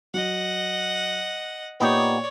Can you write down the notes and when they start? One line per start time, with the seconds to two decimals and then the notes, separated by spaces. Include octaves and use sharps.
0.14 F#3 D#5 F#5
1.80 A#2 B3 D#4 G4 C#5 D5